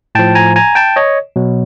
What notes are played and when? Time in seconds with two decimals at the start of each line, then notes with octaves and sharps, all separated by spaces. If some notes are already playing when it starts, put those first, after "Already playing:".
0.15 A2 F3 G5 A5
0.35 G#5 A#5
0.56 G#5 A#5
0.75 G5 A5
0.96 C#5 D#5
1.36 B2 F#3